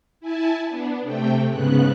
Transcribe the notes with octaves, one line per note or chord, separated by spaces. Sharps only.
E4 G#5 A5
B3 D4
C3 A3 G5
G#2 C#3 B3 F#6